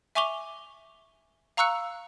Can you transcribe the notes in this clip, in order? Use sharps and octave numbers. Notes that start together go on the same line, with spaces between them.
E5 G#5 C#6 D6 F7 G7
F5 A#5 C#6 E6 F#6 C#7